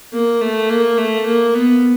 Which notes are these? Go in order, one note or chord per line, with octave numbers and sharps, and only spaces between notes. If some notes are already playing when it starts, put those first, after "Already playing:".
A#3
A3
A#3
A3
A#3
B3